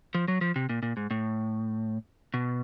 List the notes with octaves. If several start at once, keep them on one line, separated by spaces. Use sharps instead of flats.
F3
F#3
F3
C3
A#2
A#2
G#2
A2
B2